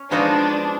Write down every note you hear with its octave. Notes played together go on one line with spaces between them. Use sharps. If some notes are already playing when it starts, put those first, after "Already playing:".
Already playing: C#4
F3 G#3 B3 D4 D#4 F#4